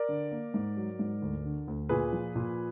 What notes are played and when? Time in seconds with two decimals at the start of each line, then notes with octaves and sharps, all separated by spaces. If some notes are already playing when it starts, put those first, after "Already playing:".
Already playing: A#4 D5
0.09 D3
0.31 A#3
0.54 G#2
0.77 F#3
0.99 G#2
1.22 D2
1.45 D3
1.68 D2
1.89 A#2 G#4 B4
2.13 F3
2.36 A#2